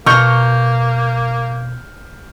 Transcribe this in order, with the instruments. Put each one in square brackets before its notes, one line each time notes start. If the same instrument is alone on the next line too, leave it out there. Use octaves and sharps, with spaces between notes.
[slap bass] B2 [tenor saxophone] A#3 [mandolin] A#5 C#6 [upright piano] F6 G6